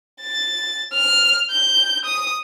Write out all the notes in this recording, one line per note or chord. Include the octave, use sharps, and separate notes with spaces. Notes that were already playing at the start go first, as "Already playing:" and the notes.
A6
F6
G6
D#6